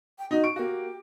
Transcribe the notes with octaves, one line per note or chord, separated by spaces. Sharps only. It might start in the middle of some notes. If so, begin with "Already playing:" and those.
G5
D#4 F#4
C#6 D7
A#3 F#4 G4